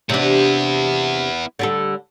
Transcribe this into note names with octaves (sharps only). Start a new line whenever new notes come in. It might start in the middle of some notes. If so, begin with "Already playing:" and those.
C3 B3 D4 E4
D3 G3 A4